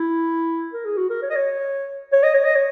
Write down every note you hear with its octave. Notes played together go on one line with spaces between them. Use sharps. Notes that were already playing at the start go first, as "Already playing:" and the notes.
Already playing: E4
A#4
G#4
F#4
A#4
C#5
D#5
C#5
C#5
D#5
C#5
D#5
C#5